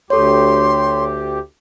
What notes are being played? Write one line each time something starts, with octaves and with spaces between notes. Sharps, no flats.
D2 G4 A4 C#5 C6